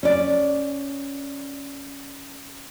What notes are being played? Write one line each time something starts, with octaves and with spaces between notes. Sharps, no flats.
C#4 D5